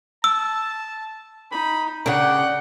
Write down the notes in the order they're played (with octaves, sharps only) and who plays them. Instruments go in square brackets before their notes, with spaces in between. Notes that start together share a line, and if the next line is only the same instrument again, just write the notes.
[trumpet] A5 [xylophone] E6
[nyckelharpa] D#4 [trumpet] B5
[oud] C#3 D4 [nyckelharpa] F#5 [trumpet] G5